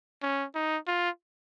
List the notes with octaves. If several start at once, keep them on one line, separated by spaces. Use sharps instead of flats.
C#4
D#4
F4